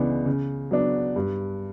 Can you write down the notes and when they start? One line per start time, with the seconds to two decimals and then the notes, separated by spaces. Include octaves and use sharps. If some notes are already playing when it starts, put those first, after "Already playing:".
Already playing: C#2 C#3 E3 B3 D4
0.26 C#3
0.71 F#3 B3 D4
1.16 G2